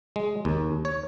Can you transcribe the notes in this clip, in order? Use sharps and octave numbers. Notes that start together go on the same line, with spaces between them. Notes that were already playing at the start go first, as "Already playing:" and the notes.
G#3
D#2
C#5